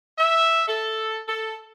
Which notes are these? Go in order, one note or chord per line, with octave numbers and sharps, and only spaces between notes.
E5
A4
A4